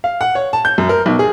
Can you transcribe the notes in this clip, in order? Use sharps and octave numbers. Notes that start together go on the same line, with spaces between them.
F5
F#5
C#5
A5
G6
F#2
A#4
B1
G#4